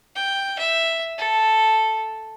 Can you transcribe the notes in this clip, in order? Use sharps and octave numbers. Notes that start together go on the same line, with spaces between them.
G5
E5
A4